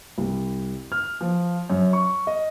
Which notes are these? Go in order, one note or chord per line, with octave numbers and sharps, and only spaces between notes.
C2
F6
F3
F#2
C#6
D#5